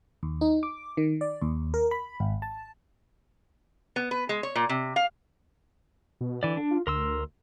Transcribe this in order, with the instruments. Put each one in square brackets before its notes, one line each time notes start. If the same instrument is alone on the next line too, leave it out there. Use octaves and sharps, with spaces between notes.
[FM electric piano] D#2
D#4
D6
D#3
D5
D#2
A#4
B5
G#1
A5
[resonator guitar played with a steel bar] B3
B4
G#3
C#5
A#2
C3
F5
[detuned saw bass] B2
[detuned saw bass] D3 [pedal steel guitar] E3 D5
[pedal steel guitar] D4
[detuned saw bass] F4
[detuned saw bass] D2 [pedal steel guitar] A#4 C6 E6